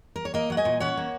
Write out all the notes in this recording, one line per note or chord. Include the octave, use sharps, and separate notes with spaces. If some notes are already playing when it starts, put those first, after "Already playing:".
A#4
C#5
A#3 A#4 D#5
F#3 F#5
D#5 G#5
A#2
C#4 C#5 F#5
A#3